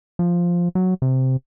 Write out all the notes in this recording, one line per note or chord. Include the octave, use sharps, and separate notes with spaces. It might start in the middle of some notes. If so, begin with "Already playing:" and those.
F3
F#3
C3